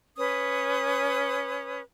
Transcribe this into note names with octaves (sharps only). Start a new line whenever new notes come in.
C#4 B4 D#6